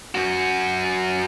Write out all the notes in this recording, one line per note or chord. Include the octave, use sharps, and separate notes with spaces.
F#2 F#4